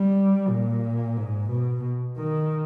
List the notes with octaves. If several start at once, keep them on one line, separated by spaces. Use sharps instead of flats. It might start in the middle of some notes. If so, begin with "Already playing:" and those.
Already playing: G3
A#2
G#2
B2
D#3